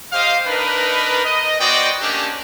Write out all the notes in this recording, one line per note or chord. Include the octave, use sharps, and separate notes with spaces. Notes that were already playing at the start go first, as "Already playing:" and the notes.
G4 C5 D#5 F5
D4 D#4 A#4 B4
D#5
B3 F#4 C5 D5 D#5 G5
A3 A#3 C#4 D4 G4